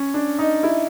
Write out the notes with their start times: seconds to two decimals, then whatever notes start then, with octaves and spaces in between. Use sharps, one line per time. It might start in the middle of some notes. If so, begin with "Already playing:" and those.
Already playing: C#4
0.14 D4
0.39 D#4
0.63 E4